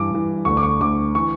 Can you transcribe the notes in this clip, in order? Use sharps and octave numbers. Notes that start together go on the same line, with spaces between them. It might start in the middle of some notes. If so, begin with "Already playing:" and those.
Already playing: G2 E3 D6
G2 E3
D2 D3 C#6
D6
C#6
D2 D3 D6
E3 C#6